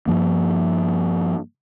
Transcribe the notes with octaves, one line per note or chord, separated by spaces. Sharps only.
G2 F3 A#3